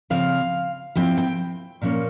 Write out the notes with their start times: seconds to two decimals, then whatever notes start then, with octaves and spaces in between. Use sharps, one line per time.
0.10 C#3 F3 C4 F5
0.95 F3 C4 E4 G5
1.17 G5
1.82 A#2 F3 A#3 C#4